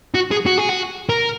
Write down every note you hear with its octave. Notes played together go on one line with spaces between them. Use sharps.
F#4
G#4
F#4
G#4
F#4
A#4